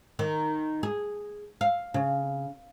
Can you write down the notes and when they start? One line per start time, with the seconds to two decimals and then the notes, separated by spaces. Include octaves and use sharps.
0.19 D#3
0.83 G#4
1.61 F5
1.94 C#3